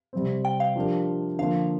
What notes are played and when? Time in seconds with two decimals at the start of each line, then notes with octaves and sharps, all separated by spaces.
0.13 C3 G3 C4
0.45 G5
0.60 F5
0.76 F3 D4 G4 A#4
1.39 D3 F3 A#3 F5